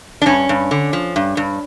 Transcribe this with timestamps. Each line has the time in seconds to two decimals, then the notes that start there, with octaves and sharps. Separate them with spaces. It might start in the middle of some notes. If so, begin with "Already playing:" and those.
0.22 D4
0.26 G2 C#4
0.49 G2
0.71 D3
0.93 F3
1.16 G2
1.37 G2